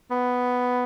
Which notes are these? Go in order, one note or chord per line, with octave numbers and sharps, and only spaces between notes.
B3